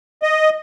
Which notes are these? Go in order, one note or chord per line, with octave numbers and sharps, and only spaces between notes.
D#5